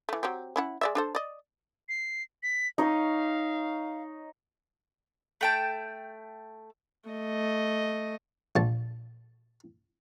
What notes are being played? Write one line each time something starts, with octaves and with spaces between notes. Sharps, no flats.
E3 A3
F#3 C4 G4
C#4 E4 F#5
G#3 D5 E5
D4 A4 C5
D5 D#5
C7
B6
D#4 C#5 D#5 F5
A3 G5 A5
A3 D#5
A#1 A5